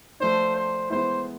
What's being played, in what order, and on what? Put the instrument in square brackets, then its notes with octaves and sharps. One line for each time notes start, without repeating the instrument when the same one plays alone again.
[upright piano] F3 A3 D4 [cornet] C5
[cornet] C5
[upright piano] E3 G#3 B3 E4 [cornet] C5